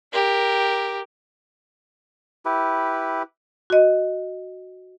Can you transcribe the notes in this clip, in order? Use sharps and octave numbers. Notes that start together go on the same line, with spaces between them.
G4 A#4
E4 G4 B4
F#4 D#5